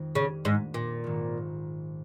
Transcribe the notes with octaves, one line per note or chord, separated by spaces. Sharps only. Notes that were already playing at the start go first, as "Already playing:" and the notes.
Already playing: F2 D#3 G#3 D#4
C#3
G#2
A#2
A#1 G#2 D#3